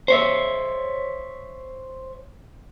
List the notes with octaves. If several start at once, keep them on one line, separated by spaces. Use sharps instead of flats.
C5 C#5 E5